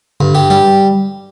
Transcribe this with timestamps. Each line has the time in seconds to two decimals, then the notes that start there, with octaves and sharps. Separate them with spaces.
0.20 G2 D3
0.35 G4
0.50 G3 G4